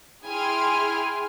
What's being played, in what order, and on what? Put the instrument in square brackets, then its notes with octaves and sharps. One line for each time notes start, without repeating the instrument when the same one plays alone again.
[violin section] E4 G#4 G5 G#5 C6 F6